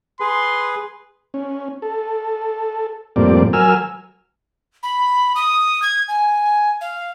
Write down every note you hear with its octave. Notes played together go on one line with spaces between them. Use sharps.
G#4 B4 C6
C#4
A4
F2 A2 G3 A#3 C4 D5
F#3 A#4 G#5 E6 F6
B5
D#6
G#6
G#5
F5